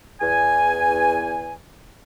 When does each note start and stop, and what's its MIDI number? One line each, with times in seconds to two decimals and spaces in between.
0.21 1.52 40
0.21 1.52 80